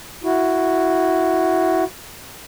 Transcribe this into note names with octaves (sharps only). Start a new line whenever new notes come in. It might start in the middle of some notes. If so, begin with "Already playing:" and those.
E4 F#4